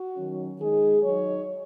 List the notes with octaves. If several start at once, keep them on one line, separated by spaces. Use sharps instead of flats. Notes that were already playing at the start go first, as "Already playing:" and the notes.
Already playing: F#4
D#3 F#3 C#4
D#3 G#3 D#4 G#4
F#3 D#4 C#5